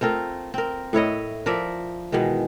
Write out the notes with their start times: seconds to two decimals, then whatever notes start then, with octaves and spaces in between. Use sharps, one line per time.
0.01 A3 C4 F4 A#4
0.54 C4 A#4
0.93 A2 E4 C#5 D#5
1.46 F3 A#4 D5 E5
2.12 B2 D#3 E3 G#3